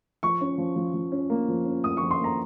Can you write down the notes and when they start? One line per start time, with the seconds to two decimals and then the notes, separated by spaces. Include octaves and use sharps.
0.23 F3 C#6
0.41 C#4
0.58 F3
0.76 F3
0.94 F3
1.12 C#4
1.30 A#3
1.48 F3
1.65 C#4
1.84 A#3 D#6
1.97 F3 C#6
2.11 C6
2.20 A#3 A#5